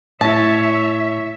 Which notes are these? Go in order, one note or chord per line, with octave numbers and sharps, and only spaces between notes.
A2 E4 C#5 E5 A5